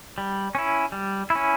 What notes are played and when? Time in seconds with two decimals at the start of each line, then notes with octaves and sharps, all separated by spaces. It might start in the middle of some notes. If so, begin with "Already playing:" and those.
0.18 G3
0.55 C#4 E4
0.92 G3
1.30 E4
1.35 C#4